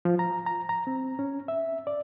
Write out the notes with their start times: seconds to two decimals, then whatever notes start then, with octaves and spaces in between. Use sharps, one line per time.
0.05 F3
0.19 A#5
0.46 A#5
0.69 A#5
0.87 C4
1.19 C#4
1.48 E5
1.87 D5